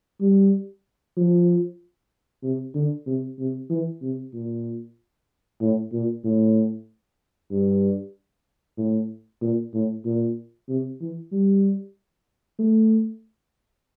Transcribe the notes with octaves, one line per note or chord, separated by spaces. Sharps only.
G3
F3
C3
D3
C3
C3
E3
C3
A#2
A2
A#2
A2
G2
A2
A#2
A2
A#2
C3
E3
G3
A3